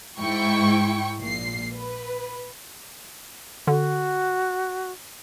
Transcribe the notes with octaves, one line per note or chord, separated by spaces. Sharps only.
G#2 E4 G5 C#6
A#1 A#2 C7
B4
D3 F#4